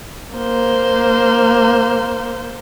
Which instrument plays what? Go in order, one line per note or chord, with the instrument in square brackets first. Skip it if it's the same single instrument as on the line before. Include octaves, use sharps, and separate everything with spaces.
[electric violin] A#3 C5